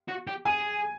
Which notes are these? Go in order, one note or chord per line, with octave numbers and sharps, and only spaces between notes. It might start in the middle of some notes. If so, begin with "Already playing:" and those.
F#4
G4
G#4 G#5